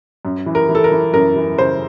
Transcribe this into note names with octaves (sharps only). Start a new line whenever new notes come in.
F#2
E3
A#4
E3
A4
A#4
E3
F#2 A#4
E3
C#3 C5